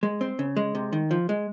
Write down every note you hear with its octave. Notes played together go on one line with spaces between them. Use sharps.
G#3
C4
C#3
G#3
C3
D#3
F3
G#3